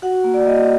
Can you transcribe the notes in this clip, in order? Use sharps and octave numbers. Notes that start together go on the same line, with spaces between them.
F#4 F#5
A#3
D5
A#3 D#5